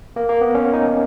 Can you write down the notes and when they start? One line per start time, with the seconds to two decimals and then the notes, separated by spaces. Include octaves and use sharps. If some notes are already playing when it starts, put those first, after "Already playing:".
0.16 A#3
0.29 A#3
0.41 B3
0.55 C#4
0.73 D#4